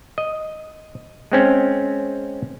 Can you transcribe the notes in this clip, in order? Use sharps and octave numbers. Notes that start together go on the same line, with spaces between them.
D#5
G#3 C4 C#4